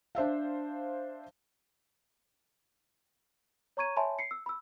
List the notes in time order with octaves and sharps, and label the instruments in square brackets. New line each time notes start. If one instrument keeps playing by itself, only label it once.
[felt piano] D4 C5 E5 F5
[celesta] C#5 A#5 C#6 G#6 D#7
C#5 E5 G#5 A5 B5 C6
C7 C#7
E6
B5 E6